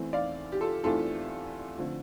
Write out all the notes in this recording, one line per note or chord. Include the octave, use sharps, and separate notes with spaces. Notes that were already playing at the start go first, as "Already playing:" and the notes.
Already playing: E2 E3 A3 C4
D5 F5
G4
F4 A4
E2 E3 A3 C4 F4 A4
D3 F3 A3 C4